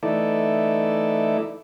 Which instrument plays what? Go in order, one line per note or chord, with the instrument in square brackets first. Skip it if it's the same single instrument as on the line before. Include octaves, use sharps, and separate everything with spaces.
[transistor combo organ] E3 A3 D#4 E4 A4 D5